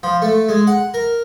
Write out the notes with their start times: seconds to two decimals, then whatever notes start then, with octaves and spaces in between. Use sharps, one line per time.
0.03 F3
0.22 A3
0.49 G#3
0.67 F#5
0.94 A#4